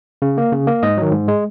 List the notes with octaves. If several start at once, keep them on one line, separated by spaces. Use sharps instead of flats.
C#3
A#3
C#3
A#3
G#2 D#5
D#3 F#3
G#2
G#3